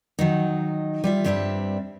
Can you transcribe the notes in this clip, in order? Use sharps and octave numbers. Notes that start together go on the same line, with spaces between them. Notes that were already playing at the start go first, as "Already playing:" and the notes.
D#3 F#3 D#4
G3 F4 E5
G2 G3 C4 D4 A#4 E5